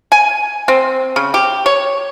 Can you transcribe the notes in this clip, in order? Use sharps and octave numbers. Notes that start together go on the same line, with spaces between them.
G#5
C4
C#3
G4
C#5